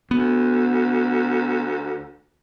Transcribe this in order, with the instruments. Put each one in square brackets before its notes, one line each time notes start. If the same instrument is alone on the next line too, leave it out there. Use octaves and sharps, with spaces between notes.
[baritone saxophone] D2 [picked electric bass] B3